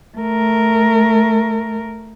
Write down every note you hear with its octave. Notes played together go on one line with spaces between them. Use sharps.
A3 A#4